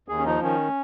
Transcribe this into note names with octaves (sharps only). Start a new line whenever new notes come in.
D#2 G#4
C#4
F3 D#4
D#3 C#4